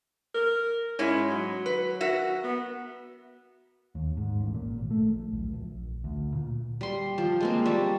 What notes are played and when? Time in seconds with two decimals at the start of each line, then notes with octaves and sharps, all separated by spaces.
0.34 A#4
0.99 G#2 G#3 C#4 E4
1.30 F#3
1.66 B4
2.01 F#4 A#4 E5
2.43 B3
3.95 D#2
4.17 G#2
4.40 A1
4.54 A#2
4.78 G#1
4.91 A3
5.10 A#1
5.33 D1
5.54 A#1
6.04 D2
6.34 A#2
6.81 G3 C6
7.18 F3
7.40 G#3 A#3 C4
7.66 G3 A5 C#6